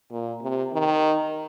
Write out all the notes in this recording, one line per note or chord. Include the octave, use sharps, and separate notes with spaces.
A#2
C3
D#3